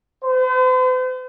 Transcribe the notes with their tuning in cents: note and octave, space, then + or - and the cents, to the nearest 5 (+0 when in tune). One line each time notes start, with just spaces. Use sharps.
C5 -45